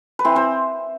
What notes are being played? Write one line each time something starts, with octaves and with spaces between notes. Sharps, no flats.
B4
E3 C4 C5
C4 C5